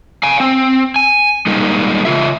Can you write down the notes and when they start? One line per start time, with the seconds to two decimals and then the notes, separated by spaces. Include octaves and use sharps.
0.23 F5 G#5
0.40 C4
0.96 G#5
1.47 G3 G#3 A#3 D#4
2.05 C#3 F4 E5